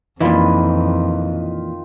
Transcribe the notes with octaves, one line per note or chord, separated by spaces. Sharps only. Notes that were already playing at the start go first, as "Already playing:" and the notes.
F2 A#2 D#3 E3 F4 B4